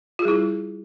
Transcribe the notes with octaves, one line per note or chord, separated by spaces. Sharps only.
G3 E4 F4 G#4